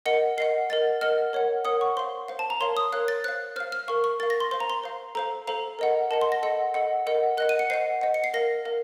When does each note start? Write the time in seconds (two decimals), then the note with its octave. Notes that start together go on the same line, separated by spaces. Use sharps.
0.06 A#4 D#5 F#5 C#7
0.38 A#4 D#5 F#5 C7
0.69 A#4 D#5 F#5 A6
1.01 A#4 D#5 F#5 F6
1.33 A#4 C#5 F#5
1.65 A#4 C#5 F#5 D#6
1.81 C#6
1.97 C5 F5 C6
2.28 C5 F5
2.39 A5
2.50 A#5
2.60 A#4 C#5 F5 C6
2.77 D#6
2.92 A#4 C#5 F5 F#6
3.08 A6
3.24 C5 F5 F#6
3.56 C5 F5 F6
3.72 F6
3.88 A#4 F5 C#6
4.04 C#6
4.20 A#4 A6
4.23 F5
4.30 A#6
4.40 C6
4.51 C5 F5 C6
4.60 A#5
4.70 C6
4.84 C5 F5
5.15 A4 C5 F5 A#5
5.47 A4 C5 F5 A#5
5.79 A#4 D#5 F#5
6.11 A#4 D#5 F#5 A5
6.21 C6
6.32 A#6
6.43 A4 D#5 F#5
6.74 A4 D#5 F#5
7.07 A#4 D#5 F#5
7.37 A#4 D#5 F#5 F#6
7.49 D#7
7.59 C#7
7.70 C5 D#5 F#5 C7
8.01 C5 D#5 F#5
8.14 C#7
8.24 C7
8.34 A#4 F5 A#6
8.65 A#4 F5